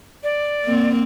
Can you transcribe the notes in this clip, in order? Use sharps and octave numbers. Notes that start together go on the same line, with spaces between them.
D5
A#3 C4